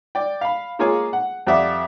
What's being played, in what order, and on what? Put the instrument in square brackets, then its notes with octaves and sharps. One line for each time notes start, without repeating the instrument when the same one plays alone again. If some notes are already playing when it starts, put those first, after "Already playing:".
[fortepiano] D5 G5
F5 B5
G#3 A#3 F4 G#4 C#5 G#5
F#5
F2 G4 D5 E5 F#5 D6